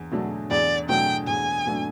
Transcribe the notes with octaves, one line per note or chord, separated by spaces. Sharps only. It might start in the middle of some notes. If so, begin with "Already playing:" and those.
Already playing: E2 D4
B2 F#3 A3 D4
E2 D5
B2 F#3 A3 D4 G5
E2 G#5
B2 F#3 A3 D4